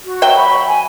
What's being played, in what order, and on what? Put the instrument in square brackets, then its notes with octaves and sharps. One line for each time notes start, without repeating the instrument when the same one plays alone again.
[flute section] F#4
[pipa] F#3 E5 G5
[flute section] B5 C#6
G#5